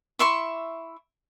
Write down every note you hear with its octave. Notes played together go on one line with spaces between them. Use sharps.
E4 E5 C6 C#6